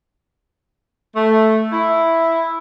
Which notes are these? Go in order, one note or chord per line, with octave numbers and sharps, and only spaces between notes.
A3
E4